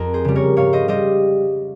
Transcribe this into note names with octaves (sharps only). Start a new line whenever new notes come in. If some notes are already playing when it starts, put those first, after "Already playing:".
Already playing: F2 A#4
G#4 C5
C#3 G3
A#4 C#5
G#2 C#5 F5
C5 D#5
G3 C5 D#5